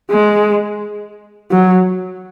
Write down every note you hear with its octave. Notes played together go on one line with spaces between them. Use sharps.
G#3
F#3